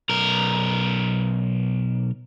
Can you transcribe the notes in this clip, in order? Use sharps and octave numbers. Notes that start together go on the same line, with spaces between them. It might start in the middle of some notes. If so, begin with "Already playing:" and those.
B1 A#4